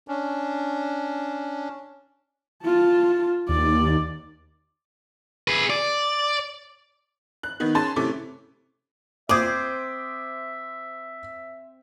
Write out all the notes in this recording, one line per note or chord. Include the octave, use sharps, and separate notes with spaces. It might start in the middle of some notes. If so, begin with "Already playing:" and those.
C#4 D4
F4 A5
D#2 D5
G#4 B4
D5
F#6
D#3 B3
C#4 G#4 A5 C6 A6
C3 A3 C#4 E4 D6
C4 C5 E5 D6 D#6 G#6